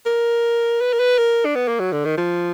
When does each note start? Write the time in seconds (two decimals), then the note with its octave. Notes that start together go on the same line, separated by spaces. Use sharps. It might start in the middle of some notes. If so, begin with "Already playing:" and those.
0.06 A#4
0.81 B4
0.93 A#4
0.99 B4
1.18 A#4
1.45 D4
1.55 B3
1.68 A#3
1.79 F#3
1.92 D3
2.05 D#3
2.17 F3